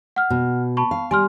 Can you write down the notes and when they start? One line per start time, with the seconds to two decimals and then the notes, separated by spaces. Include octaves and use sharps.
0.16 F#5 F6
0.30 B2
0.77 A5 B5 C#6
0.91 F5
1.11 G3 G#5 C6 F6